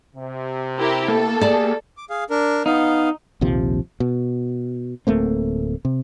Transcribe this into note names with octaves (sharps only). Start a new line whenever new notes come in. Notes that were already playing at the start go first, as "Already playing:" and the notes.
C3
E4 G4 A#4
A#3 A4
G4 G#4 D5 A5
D6
G#4 F5
D4 A#4
B3 D#4 F5
A#1 D#2 C3 F3
B2
D1 A3 A#3 C4
C3